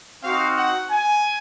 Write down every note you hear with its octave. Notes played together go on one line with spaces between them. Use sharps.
C4 D#4 F#4 F5
F#5
G#5